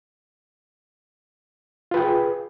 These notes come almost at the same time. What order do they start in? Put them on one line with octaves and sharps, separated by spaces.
F4 B4 G5 G#4